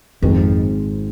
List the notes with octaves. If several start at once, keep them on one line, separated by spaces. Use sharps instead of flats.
G#1 F2 G#2 G#3 C4 G#4